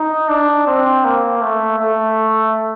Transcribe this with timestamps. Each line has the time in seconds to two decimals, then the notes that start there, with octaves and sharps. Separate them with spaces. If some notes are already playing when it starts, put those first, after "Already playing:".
Already playing: D#4
0.29 D4
0.67 C4
1.04 A#3
1.41 A3
1.78 A3